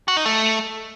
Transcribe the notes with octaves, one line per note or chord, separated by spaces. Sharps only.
F#4
D#4
A3